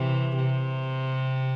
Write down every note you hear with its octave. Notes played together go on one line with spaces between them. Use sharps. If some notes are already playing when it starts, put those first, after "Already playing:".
Already playing: C3 E3
C3